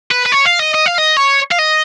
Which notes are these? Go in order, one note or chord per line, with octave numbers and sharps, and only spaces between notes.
B4
B4
C#5
F5
D#5
D#5
F5
D#5
C#5
F5
D#5